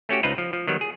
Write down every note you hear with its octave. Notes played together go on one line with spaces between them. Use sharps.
A3 C#4 F#4 G4
C#2 D#4 F4 B4 C5 A#5
F3
F3
D#3 F#3 G3 B3
G#4